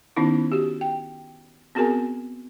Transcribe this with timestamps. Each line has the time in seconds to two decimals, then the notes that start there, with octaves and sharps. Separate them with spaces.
0.17 D#3 B3 C#4 D#4 E4
0.52 F#4 G4
0.81 G5
1.75 B3 C4 F#4 G#4 A#4 G#5